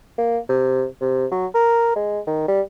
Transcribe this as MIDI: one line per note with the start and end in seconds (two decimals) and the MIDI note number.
0.18 0.38 58
0.49 0.85 48
1.01 1.26 48
1.31 1.47 54
1.55 1.92 70
1.96 2.20 56
2.27 2.48 51
2.48 2.61 55